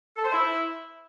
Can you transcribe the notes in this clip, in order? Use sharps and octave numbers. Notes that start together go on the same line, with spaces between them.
A4
C5
E4